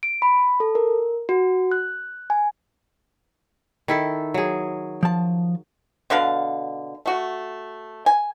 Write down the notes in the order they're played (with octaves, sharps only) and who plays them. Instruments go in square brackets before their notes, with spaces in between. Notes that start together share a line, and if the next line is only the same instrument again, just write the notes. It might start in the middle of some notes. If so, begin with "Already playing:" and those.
[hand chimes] D7
B5
A4
A#4
F#4
F#6
G#5
[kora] D#3 E4 A4
F#3 G#4
[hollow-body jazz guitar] F3 A5
[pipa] B2 D3 B4 F5
A3 F#4
G#5